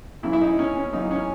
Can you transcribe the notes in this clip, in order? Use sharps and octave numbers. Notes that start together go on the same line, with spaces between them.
F#2 C#3 E3 E4
E4
D#4
C#4
C#4
F#2 C#3 E3 D#4
C#4